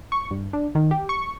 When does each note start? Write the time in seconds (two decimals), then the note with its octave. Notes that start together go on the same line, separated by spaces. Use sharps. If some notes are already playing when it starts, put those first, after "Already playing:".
0.12 C#6
0.31 G2
0.53 D4
0.75 D#3
0.91 G4
1.09 C#6